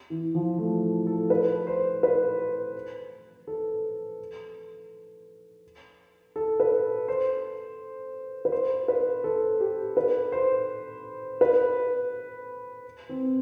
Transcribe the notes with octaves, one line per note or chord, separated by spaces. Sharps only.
E3
F3
A3
A4
B4
C5
B4
A4
A4
B4
C5
B4
C5
B4
A4
G4
B4
C5
B4
C4